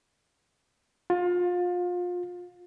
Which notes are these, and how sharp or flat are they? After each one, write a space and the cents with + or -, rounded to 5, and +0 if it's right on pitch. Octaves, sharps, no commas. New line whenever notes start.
F4 +30 F5 +30